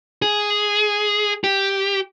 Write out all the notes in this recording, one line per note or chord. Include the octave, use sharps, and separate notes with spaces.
G#4
G4